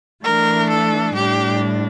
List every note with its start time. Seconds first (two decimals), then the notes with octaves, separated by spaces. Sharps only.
0.24 E3 A3 D4 A#4
0.70 A4
1.15 A2 G3 D4 G4